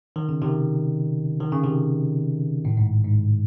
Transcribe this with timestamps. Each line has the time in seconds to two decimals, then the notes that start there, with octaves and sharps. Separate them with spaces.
0.16 D#3
0.29 C#3
0.42 C3 D#3
1.40 D#3
1.52 C#3
1.63 C3 D#3
2.65 A2
2.77 G#2
3.04 G#2